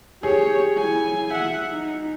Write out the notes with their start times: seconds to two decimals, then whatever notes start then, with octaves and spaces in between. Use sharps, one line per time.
0.23 G4 G#4 C#5
0.78 E4 G#5
1.32 E5 F#5
1.71 D#4